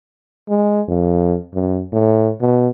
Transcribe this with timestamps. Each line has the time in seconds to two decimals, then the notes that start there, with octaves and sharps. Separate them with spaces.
0.49 G#3
0.88 F2
1.54 F#2
1.92 A2
2.41 B2